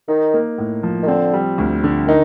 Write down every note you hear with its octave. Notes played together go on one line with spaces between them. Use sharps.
D#3 D#4
A#3
A2
F3
D#3
D3 C4
G3
D2
D3
D#3 D#4